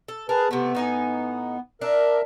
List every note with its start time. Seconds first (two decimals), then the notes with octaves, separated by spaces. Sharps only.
0.08 A4
0.29 G#4 A#4 B4 A5
0.51 C3 A3 B3
0.75 A2 D#4 G#5
1.81 D4 A#4 E5